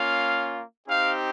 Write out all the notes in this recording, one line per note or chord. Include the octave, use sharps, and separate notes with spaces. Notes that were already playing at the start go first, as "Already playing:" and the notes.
Already playing: A#3 C#4 F4 F5
C4 D#4 G4 F5